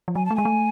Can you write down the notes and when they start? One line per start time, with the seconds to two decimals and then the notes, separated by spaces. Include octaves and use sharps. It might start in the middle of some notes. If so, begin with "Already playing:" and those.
0.08 F3
0.15 F#3 G#5
0.26 A3 A5
0.36 G#3 G#5
0.45 A3